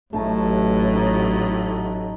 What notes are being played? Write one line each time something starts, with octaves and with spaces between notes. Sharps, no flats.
A1 A2 F#3 A3 D#4 A5
D#4